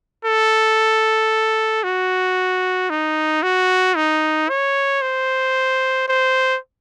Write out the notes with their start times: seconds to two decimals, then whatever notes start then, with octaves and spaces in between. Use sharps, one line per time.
0.25 A4
1.84 F#4
2.90 D#4
3.43 F#4
3.96 D#4
4.49 C#5
5.02 C5
6.08 C5